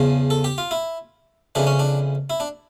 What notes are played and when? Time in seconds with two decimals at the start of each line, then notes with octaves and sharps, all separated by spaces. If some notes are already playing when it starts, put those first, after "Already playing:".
Already playing: E2 C#3 F3
0.30 A4
0.44 G4
0.58 F4
0.71 E4
1.55 F2 C#3 E3 D4
1.67 C#4
1.79 D4
2.30 E4
2.40 D4